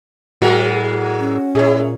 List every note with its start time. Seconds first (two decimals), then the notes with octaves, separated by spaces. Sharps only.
0.42 A2 F#3 G#3 F#4 A#4
1.19 C#4
1.55 A#2 G#3 E4 G#4 C#5